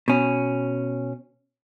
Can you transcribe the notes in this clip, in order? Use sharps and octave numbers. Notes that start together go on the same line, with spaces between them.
B2 C#4